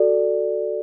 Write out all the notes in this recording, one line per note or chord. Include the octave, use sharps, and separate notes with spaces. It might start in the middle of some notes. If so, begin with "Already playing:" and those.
Already playing: F#4 A4 D5